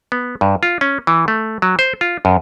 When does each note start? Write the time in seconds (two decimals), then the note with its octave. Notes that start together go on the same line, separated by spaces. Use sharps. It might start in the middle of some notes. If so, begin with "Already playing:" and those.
0.12 B3
0.41 G2
0.63 F4
0.81 C#4
1.07 E3
1.28 A3
1.62 F#3
1.79 C5
2.01 F4
2.25 F#2